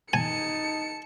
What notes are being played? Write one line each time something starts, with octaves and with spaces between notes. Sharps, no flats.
D#4 G#5 A5 C#7